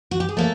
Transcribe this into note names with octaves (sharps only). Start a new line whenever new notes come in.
F#4
G4
G#4
A3 A#3 C#4 A4